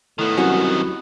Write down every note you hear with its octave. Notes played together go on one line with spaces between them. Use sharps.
A2 D#3 B3
C2 F#3 C#4 F#4